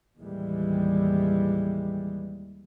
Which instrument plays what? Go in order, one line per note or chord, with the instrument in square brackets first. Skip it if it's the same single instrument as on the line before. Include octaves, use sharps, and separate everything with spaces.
[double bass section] D#2 A2 E3 G3 G#3